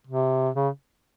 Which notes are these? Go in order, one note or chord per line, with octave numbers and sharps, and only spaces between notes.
C3
C#3